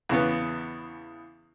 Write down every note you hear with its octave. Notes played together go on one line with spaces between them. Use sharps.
E2 C#3 B3